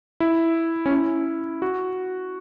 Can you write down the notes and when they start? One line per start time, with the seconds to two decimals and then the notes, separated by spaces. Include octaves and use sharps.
0.20 E4
0.86 C#4
0.91 E4
1.62 F#4